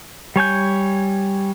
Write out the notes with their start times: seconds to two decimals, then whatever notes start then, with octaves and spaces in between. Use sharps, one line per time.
0.36 G3 C#5 G#5 G6